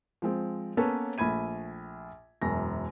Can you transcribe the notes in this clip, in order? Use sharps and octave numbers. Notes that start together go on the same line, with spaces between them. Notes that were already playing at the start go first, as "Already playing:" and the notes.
F3 G#3 C4
A#3 B3 C#4 A4 B4 C#5
A#1 A3 B5 G#6 D#7
E1 F#2 A#6